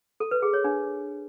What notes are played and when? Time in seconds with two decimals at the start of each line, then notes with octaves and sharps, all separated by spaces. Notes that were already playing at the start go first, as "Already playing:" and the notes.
0.20 A4
0.31 B4
0.42 G#4
0.53 C#5
0.64 D4